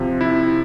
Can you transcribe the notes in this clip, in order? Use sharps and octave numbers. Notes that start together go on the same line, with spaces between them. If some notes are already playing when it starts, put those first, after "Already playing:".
Already playing: C3 F3
E4